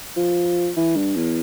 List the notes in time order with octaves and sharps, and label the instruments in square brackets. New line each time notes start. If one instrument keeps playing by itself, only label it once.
[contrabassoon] F3
E3
G2
E2